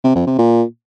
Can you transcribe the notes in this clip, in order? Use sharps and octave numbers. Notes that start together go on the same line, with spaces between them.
C3
F2
C3
A#2